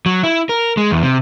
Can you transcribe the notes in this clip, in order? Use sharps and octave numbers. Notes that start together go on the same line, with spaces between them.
F#3
E4
A#4
G#3
E2
C3